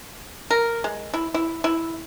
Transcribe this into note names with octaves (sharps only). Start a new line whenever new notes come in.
A#4
G#3
E4
E4
E4